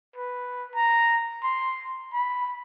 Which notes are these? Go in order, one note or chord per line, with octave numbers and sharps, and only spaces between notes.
B4
A#5
C6
B5